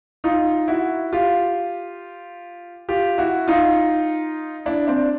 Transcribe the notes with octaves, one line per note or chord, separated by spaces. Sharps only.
D#4 F4
E4 F#4
F4 G4
F4 G4
E4 F#4
D#4 F4
D4 E4
C4 D4